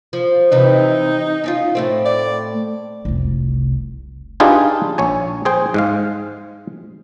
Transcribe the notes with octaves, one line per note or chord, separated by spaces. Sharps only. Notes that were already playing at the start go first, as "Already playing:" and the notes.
F3
C3 E3 D#4
C#4 D4 F4
A2 A3 C4
D5
F1 C2
D4 D#4 F4 G4 G#4 B4
A#1 C#5 G#5
G#4 C5 G5
G#2 G#3 F5